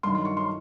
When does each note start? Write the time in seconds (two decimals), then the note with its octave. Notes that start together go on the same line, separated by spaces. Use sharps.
0.03 G2 D#3 F#3 C6
0.15 C6
0.25 C#6
0.37 C6